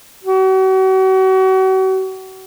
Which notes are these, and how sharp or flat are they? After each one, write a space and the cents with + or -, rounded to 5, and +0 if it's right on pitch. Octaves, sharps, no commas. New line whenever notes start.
F#4 +40